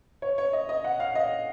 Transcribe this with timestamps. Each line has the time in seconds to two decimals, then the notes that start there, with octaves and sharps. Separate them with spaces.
0.22 C#5
0.38 C#5
0.53 D#5
0.69 D#5
0.84 F#5
1.00 F5
1.15 D#5